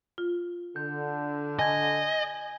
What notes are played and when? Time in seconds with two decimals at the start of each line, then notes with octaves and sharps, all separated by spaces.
0.18 F4
0.76 D3 G6
1.59 D#5 G#5 G#6